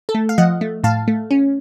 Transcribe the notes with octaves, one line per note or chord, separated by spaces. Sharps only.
A4
A3
F5
F3 D#5 F#5
A3
A2 F5 A5
A3
C#4